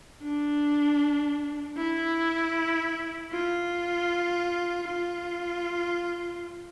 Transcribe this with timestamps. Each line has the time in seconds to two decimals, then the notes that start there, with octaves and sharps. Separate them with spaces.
0.23 D4
1.77 E4
3.33 F4
4.87 F4